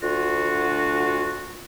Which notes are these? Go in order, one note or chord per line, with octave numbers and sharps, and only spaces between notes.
D2 F4 F#4